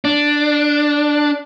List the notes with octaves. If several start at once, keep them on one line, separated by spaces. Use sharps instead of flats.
D4